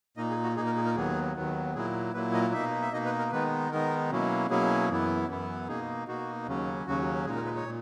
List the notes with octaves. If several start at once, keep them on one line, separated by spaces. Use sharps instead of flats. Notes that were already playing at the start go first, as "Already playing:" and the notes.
A#2 A#3 D#4 D#5
G#4
F#4
A#2 A#3 D#4 G#4
A#4
G#4
A#4
D#2 D#3 F#3 B3 G#4
D#2 D#3 F#3 B3
A#2 F#3 A#3 E4 G#4
A#2 F#3 A#3 E4 B4
D#5
B2 A#3 D#4 E5
E5
B2 A#3 D#4 D#5
B4
A#4
D#3 G#3 B3 D#4 B4
D#3 G#3 B3 D#4 A#4
B2 F#3 A#3 C#4 E4
B2 F#3 A#3 C#4 E4 G#4
F#2 E3 B3 E4
F#2 E3 B3 E4
B2 A#3 D#4 G#4
B2 A#3 D#4 F#4
D#2 C#3 F#3 C#4
D#2 C#3 F#3 C#4 F#4
A#2 G#3 D#4 G#4
A#4
B4
C#5
A#2